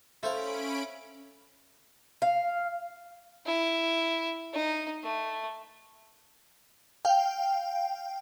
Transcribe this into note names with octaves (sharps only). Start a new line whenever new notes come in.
A3 C#4 E4 C5 F5 B5 D7
F5
E4
D#4
A3
F5 G5